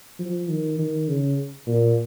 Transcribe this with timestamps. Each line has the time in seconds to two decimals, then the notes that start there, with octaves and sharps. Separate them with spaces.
0.19 F3
0.49 D#3
0.79 D#3
1.08 C#3
1.67 A#2